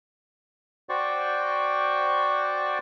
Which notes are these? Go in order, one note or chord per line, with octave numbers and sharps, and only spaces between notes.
F#4 C5 D5 G5 C#6